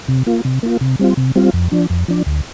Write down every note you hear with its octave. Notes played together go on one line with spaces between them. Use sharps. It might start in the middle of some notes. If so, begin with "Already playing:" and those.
C3
A#3 F4
C3
A#3 F4
C3
G3 C4 F4
C3
G3 C4 F4
F2
F3 D4
F2
F3 D4
D2